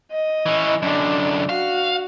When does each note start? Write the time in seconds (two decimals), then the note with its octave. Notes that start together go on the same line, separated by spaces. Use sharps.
0.11 D#5
0.46 E3 C#4
0.82 F#2 D3 D4
1.49 F#4 F5